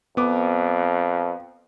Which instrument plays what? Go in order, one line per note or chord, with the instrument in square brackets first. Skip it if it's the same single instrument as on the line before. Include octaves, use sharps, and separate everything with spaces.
[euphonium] F2 [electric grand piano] B3 D6